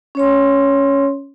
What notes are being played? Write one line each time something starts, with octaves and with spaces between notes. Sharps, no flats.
C#4 C#5 C6